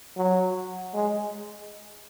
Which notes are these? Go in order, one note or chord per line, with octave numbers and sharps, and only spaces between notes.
F#3
G#3